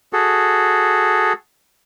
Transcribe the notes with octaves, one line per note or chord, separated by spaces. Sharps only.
F#4 G#4 A4